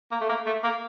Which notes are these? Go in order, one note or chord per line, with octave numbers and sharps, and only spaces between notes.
A#3
A3
A#3
A3
A#3